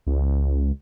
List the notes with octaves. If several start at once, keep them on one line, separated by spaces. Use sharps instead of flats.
C#2